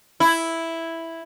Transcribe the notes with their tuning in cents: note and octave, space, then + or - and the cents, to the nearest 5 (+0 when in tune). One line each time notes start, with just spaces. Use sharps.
E4 +0